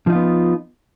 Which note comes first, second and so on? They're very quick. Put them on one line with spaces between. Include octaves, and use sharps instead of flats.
F3 D#4 F4 B3